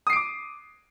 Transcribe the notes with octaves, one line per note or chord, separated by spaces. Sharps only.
D6 D#6 C7 D7